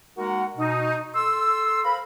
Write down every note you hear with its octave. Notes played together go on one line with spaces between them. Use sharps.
G#3 A#3 D#4 F#4 A#4 F#5
B2 D#4
A4 C6 E6
A4 A#4 C5 F5 B5